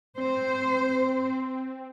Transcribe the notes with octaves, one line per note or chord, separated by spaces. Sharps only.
C4 C5